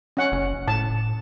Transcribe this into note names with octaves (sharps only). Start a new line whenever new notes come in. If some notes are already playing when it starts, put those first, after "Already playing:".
C#4 F#5
F#1
A2 A5